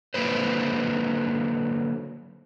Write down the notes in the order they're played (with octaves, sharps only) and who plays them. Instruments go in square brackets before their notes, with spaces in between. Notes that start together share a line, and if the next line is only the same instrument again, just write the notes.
[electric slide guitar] D3 F#3 A#3 B4 C5